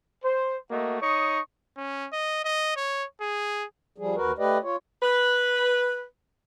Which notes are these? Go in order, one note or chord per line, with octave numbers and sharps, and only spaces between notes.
C5
A3 A#3 F#4 D#5
D#4 C#5 C#6 D#6
C#4
D#5
D#5
C#5
G#4
F3 G3 G#4
D#2 F#4 A#4 B4
A3 G4 B4 D5 D#5
F4 C#5
B4